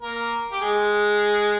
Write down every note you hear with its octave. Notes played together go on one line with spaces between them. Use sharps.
A#3 A#4
G4
G#3 G#4